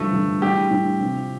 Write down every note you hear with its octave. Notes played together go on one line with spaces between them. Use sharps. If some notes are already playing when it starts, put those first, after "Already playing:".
Already playing: G2 D3 F3 A3
G2 D3 F3
A2 G3 D4 G4
A2 G3 D4
C3 F3 C4